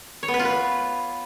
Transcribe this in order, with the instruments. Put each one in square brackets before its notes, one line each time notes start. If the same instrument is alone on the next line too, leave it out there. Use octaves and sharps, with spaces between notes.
[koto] C#5
B3
B4
F4
B4